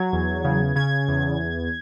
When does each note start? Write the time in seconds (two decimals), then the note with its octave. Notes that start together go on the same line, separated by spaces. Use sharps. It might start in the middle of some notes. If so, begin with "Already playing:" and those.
Already playing: F#3 G#6
0.13 E2
0.44 C#3
0.76 C#3 G#6
1.08 E2